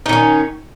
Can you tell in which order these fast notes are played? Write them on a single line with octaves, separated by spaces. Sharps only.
D#4 D#3 C#4